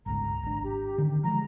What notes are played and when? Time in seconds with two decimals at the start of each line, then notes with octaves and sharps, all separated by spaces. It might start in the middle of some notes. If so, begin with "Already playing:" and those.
0.06 G1 C#2 G#2 A#5
0.43 G#1 D4
0.64 G4
0.98 D3 D#3 C#4
1.24 F3 G#3 A#5